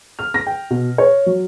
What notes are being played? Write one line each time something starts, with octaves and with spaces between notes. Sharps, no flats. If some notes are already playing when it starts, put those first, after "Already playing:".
F6
A#6
G5
B2
C#5
F#3